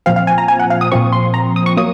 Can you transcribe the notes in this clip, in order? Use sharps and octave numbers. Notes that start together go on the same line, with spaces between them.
A#2 F3 C4 F5
F5
G#5
A#5
G#5
F#5
F5
D#6
A#2 F3 C4 C#6
C6
A#5
D#6
C#6
F#3 A#3 D#6